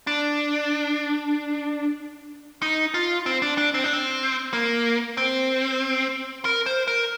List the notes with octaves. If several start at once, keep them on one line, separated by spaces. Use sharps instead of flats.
D4
D#4
F4
C4
D4
D4
C4
D4
C4
A#3
C4
A#4
C5
A#4